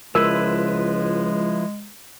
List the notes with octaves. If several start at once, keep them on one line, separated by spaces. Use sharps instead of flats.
C#2 F3 G#3 E4 A#4 B4